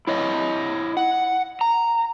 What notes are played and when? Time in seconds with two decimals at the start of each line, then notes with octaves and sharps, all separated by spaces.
0.07 E4 C#5 D#5
0.97 F#5
1.61 A#5